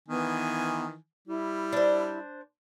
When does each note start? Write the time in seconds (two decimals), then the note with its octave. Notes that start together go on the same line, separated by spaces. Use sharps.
0.08 D#3 E3 B3 G#5
1.28 G3 E4
1.73 D4 C5